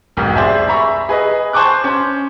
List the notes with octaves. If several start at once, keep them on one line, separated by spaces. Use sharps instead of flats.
F1 B1 G#2 G4
G#4 C5 D5 E5 G#5
E5 A#5 B5 C#6
G#4 B4 D#5
C5 G#5 A5 C#6 D6 F#6
C#4 C5